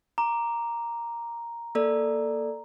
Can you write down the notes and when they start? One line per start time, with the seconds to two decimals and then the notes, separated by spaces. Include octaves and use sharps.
0.18 A#5 D6
1.75 A#3 A4 D5